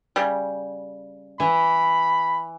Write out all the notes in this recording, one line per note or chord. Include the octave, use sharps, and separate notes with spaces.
C#3 G3
E3 B5